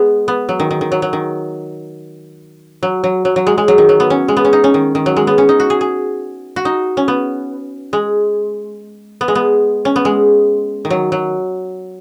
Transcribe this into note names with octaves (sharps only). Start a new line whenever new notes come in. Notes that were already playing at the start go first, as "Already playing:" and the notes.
Already playing: G#3 B3
B3
F#3
D#3
D#3
D#3
F#3
F#3
D#3
F#3
F#3
F#3
F#3
G#3
G#3
F#3
D#3
F#3
B3
C#4
G#3
B3
C#4
D#4
C#4
D#3
D#3
F#3
G#3
B3
C#4
D#4
F#4
G#4
G#4
F#4
D#4
C#4
B3
G#3
B3
G#3
B3
C#4
B3
G#3
D#3
F#3
F#3